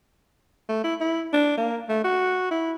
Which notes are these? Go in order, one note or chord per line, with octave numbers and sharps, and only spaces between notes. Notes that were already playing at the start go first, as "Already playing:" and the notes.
A3
E4
E4
D4
A#3
A3
F#4
E4